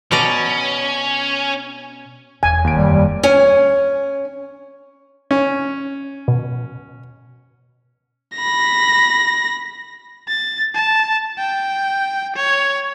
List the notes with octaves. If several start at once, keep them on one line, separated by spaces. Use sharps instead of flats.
B2 C#4 D5 A#5
E1 E2 G#5
D#2 D7
E1 F#2 D#3 G3
G3
C#4 G#5
C#4
B2
B5 A#6
A6
A5
G5
C#5